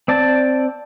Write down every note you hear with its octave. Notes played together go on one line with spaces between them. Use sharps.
C4 D5 A5